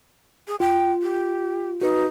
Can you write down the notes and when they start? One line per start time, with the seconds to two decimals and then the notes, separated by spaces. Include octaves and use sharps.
0.48 G#4
0.60 F4 G5
1.02 G4
1.81 D#4 F#4 B4